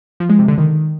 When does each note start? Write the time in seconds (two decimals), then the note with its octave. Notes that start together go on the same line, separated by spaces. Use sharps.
0.20 F3
0.30 G#3
0.39 C3
0.48 D3
0.58 D#3